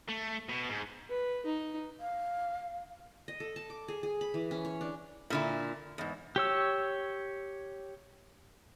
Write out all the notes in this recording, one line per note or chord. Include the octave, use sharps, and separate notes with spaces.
A3
B2
G#2
B4
D#4
F5
D#5
A4
A5
D6
G#4
G#4
B5
E3
C#4
C#5
D4
A#2 D3 E4
E2 G#2
G4 C#5 E6